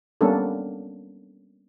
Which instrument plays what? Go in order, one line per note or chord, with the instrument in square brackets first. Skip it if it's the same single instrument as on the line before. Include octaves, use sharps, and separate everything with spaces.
[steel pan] G3 A#3 B3 C#4 D4 A4